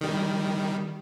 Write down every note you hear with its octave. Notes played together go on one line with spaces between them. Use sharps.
D#3 G3